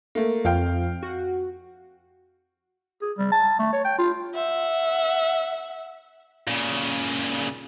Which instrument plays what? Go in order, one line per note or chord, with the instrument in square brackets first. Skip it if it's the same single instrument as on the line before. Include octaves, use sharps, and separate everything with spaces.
[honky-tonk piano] A3 A#3
[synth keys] F2 [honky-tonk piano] F5 G5
[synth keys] F#4
[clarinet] G#4
G3
A5
A3
C#5
G5
F4
[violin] E5 F#5
[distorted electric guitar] A#2 C#3